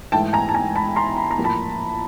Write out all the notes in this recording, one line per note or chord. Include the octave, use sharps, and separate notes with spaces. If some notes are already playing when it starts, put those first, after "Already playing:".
G#2 E3 A3 G5 A5
G#5 A#5
A5
G#5 A#5
A5 B5
A#5 C6
B5
A#5
A2 F3 A#3
A5 B5